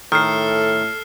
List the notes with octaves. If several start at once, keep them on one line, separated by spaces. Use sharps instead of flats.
A2 D#3 A4 F6 C7